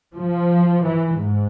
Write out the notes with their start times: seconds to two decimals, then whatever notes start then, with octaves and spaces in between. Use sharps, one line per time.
0.14 F3
0.84 E3
1.18 G#2